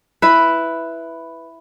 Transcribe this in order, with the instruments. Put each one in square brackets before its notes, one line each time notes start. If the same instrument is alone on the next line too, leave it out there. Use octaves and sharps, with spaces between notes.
[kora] E4 B4